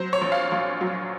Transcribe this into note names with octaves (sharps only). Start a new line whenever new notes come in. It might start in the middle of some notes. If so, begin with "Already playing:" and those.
Already playing: F#3 C5
C#5
A#1
F5
A#1
F#3